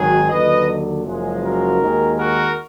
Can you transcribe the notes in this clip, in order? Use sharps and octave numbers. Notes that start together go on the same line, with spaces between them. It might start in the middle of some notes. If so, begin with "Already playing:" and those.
Already playing: G#1 G#2 D#3 F#3 G#4
D#2 D3 F#3 B4 D#5
F#1 F#2 F3 G#3
F#4 A#4
D#2 D#3 G#3
F#4 A#4